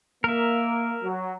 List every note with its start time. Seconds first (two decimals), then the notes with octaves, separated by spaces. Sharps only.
0.24 A#3 A#4 E5
1.03 F#3